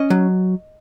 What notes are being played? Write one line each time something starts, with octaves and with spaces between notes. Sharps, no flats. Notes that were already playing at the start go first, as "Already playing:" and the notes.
Already playing: C#4 D#5
F#3